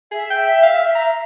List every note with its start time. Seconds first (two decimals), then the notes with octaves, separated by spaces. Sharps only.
0.12 G#4 E5
0.30 G5
0.63 F5
0.95 A#5